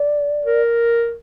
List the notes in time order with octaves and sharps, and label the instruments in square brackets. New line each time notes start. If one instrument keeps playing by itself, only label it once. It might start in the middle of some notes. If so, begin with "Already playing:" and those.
Already playing: [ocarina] D5
[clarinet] A#4